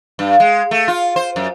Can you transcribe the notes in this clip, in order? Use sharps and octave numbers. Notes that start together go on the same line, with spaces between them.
G2
G#3
A3
F4
C5
F#2